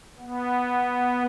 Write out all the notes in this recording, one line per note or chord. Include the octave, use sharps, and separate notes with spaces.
B3